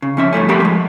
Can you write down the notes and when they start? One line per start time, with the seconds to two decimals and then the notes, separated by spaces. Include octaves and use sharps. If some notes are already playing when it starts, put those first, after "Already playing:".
0.02 C#3
0.17 F2 C#4 E5
0.33 G2 F3 A3 C#4
0.49 F2 B2 G4 A#4 F#5 B5
0.62 F3 G#3